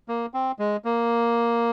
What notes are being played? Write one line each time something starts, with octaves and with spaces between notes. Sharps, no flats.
A#3
C4
G#3
A#3